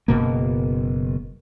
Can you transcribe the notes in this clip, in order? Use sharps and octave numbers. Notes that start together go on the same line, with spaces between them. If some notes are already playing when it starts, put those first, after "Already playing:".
F#1 B2 A#3